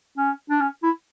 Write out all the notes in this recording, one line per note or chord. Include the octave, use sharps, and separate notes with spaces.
C#4
D4
C#4
E4